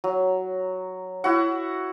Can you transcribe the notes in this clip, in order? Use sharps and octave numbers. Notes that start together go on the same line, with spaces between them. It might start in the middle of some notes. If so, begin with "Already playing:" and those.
F#3
E4 F#4 F#5